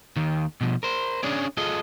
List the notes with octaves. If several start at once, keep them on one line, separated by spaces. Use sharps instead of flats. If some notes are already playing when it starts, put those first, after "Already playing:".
D#2 D#3
B2 F3
A#4 C5
C#4 D4 G#4 C#5 D5
F4 G#4 A4 D#5